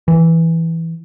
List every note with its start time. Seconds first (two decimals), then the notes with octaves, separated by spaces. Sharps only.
0.08 E3